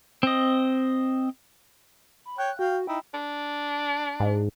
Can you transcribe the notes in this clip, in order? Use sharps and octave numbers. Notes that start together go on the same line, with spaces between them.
C4 D#5
B5
C#5 G5 F#6
F#4 F5 G5
F#4
D#4 E4 G5
D4
G#2